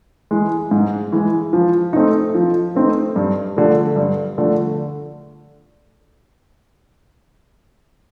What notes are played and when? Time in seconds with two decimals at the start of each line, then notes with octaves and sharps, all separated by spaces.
0.31 E3 G#3
0.71 G#2
1.12 E3 G#3
1.53 F3
1.93 A3 C4 D#4
2.35 F3
2.75 A3 C4 D#4
3.16 G2
3.57 D3 F3 A3
3.96 G2
4.38 D3 F3 A3